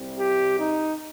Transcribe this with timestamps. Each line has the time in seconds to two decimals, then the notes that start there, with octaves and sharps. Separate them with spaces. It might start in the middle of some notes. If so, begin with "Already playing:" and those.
Already playing: C2 C3 G3
0.19 G4
0.58 D#4